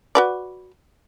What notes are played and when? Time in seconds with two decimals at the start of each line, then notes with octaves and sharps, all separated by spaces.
0.15 F#4 B4 D5